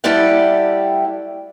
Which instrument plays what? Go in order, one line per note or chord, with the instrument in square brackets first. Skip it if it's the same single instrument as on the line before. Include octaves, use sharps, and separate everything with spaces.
[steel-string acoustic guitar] G3 A3 E4 G4 D5 F#5